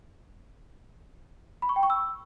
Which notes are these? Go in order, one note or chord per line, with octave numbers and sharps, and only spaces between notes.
B5
C#6
G5
C#6
E6